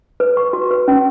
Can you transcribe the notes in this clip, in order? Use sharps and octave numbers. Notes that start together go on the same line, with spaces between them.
B4
C#6
F#4
B4
C#4